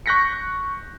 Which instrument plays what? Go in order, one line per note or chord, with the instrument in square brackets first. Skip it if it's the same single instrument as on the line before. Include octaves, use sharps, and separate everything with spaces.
[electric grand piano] C#6 F#6 G6 A#6 B6 C#7